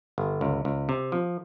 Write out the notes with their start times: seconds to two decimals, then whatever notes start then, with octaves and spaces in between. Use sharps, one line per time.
0.18 G1
0.41 C#2
0.65 C#2
0.89 C3
1.12 F3